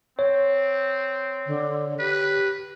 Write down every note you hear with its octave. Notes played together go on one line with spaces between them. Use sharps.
C4 C#5
D3
G4 B4